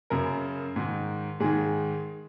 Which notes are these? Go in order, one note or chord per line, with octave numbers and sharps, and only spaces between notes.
F#2 C#3 A#4
G#2 D#3
G#2 D#3 G#4